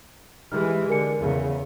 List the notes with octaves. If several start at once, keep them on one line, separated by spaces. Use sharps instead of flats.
E3 G#3 G4 F6
D3 A#4 G#5 C#7
E2 C#3